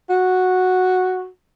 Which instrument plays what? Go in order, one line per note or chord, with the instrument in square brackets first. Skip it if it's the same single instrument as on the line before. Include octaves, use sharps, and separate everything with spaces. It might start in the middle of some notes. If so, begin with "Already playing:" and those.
[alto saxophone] F#4